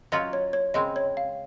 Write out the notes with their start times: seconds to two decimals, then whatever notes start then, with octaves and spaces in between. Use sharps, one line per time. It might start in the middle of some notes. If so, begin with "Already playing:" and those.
0.12 F#3 C#4 F4 D#5
0.33 C#5
0.53 C#5
0.74 C#3 G#3 C4 D#5
0.96 C#5
1.17 F5